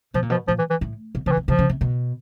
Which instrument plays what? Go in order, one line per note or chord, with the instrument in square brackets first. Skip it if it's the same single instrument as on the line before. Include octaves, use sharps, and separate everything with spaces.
[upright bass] B2 [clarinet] F3
[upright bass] A#2
[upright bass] B2 [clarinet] F3
[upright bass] A#2 [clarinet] F3
[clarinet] E3
E3
[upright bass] A2
B2
[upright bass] C#3 [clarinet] F3
[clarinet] E3
[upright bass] B2
[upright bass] C3 [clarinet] F3
[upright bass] C#3
C3
B2